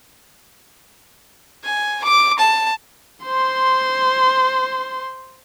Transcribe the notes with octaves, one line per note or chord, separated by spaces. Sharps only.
G#5
D6
A5
C5 C6